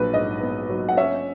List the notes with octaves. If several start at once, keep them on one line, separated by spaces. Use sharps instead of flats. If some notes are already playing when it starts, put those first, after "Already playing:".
Already playing: A#1 F#3 B4
G#2 D#5
B3
F#3
F#5
C#4 E5